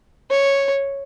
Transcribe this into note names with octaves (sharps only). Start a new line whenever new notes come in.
C#5